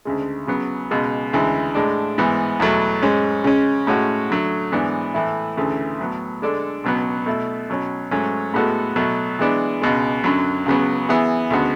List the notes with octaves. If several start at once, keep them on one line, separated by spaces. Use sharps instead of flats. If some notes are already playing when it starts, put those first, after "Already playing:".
D2 C#3 G#3
C#3 F#3 B3
C#2 B2 G#3
D2 C#3 E3 G#3
A2 G#3 D4
G#2 E3 B3
E2 B2 F#3 A3
G#2 G#3 C#4
C#3 G#3 C#4
A2 G#3 C#4 F#4
D3 F#3 A3
G#2 E3 B3 D4
A2 E3 A3 E4
D2 C#3 E3 A3
A2 F#3 B3
D3 G#3 D4 A4
C#2 B2 F#3 B3
B2 A3 E4
B2 F#3 C#4
G#2 F#3 A3 C#4
A2 G#3 B3 F#4 A4
B2 F#3 A3
E3 G#3 B3 D4
C#2 B2 G#3
F#2 D3 F#3
C#2 C#3 F#3 B3
E3 B3 E4 G#4
D2 C#3 G#3 B3 F#4